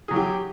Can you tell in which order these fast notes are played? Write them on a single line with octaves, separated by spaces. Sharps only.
G#4 F#3 E3 G4